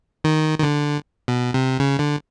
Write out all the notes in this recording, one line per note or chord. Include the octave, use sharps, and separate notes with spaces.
D#3
D#3
D3
B2
C3
C#3
D3